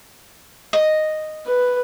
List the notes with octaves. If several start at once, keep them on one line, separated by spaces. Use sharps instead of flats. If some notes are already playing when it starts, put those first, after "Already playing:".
D#5
B4